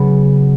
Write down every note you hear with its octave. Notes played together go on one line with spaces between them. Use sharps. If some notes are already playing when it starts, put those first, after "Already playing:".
Already playing: C#3 F#3 B3 C#4